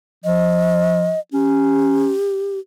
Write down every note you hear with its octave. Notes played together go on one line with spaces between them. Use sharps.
F3 D#5
C#4 G4